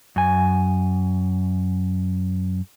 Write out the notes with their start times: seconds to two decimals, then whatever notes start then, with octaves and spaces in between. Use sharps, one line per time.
0.16 F#2 G#5